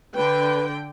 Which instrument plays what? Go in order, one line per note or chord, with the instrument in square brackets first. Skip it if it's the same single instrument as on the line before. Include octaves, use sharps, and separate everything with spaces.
[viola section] D3 G5 [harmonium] B4